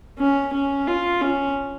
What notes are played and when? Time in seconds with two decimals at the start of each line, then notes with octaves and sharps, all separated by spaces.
0.18 C#4
0.53 C#4
0.87 F4
1.21 C#4